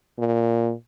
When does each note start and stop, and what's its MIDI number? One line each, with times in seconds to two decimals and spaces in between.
0.18 0.72 46